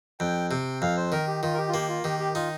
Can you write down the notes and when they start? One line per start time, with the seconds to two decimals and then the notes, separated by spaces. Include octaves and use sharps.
0.20 F2 G5
0.51 C3 G5
0.82 F2 F5
0.97 C5
1.12 D#3 A#4
1.27 G4
1.42 D#3 F4
1.54 A#4
1.58 G4
1.69 F4
1.74 A#3 G4
1.89 F4
2.04 D#3 G4
2.19 G4
2.35 D#4 F4